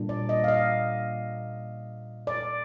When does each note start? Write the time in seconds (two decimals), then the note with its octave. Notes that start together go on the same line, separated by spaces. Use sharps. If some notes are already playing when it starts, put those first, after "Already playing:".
Already playing: A#2 G3 D4
0.09 D5
0.29 D#5
0.44 F5
0.48 D#5
2.27 D5